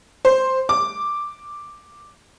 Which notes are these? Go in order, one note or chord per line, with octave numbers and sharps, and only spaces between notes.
C5
D6